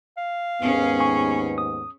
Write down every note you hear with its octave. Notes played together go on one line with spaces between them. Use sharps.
F5
D#2 G#2 B3 C#4 G#4
G#5 C#6
D#6